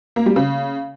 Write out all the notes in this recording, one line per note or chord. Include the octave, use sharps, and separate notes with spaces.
A#3
G3
C#3